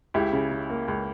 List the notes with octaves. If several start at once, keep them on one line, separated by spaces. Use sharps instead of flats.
C#2 E4 G4
C#3
C#3
A#3
C#2